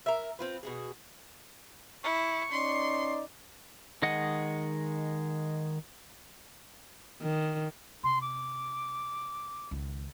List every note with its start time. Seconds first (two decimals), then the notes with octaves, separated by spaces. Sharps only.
0.06 A#4 E5
0.39 C4 F4 B4
0.63 B2 F#4 G#4
2.03 E4 C#6
2.51 C#4 D#4 D5 C6
4.02 D#3 G#3 D#5 F#5
7.21 D#3
8.03 C3 C6
8.21 D6
9.71 C#2 D#3